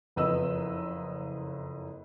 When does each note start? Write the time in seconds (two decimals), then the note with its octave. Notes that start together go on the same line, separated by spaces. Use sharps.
0.16 F#1 F2 B4 D#5 E6